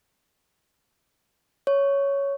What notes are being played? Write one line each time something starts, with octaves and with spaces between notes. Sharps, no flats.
C#5